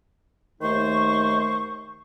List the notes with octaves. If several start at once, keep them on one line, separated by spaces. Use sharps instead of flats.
D#2 D#3 A3 D#4 C5 C#6